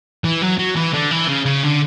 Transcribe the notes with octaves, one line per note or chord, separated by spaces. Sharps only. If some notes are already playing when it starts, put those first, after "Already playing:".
E3
F#3
F#3
E3
D3
E3
C#3
C#3
D3